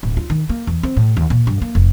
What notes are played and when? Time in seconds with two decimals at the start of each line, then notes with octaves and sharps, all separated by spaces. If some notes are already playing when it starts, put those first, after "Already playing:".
0.03 D1
0.17 F4
0.30 D#3
0.49 A#3
0.67 E2
0.83 C4
0.97 A2
1.17 D#2
1.30 A#2
1.47 G2
1.62 A#3
1.75 F1